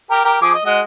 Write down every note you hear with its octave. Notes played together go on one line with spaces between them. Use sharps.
G4 A#4
G4 A#4
F3 G#4 D6
D#5
G#3 F#4 D#5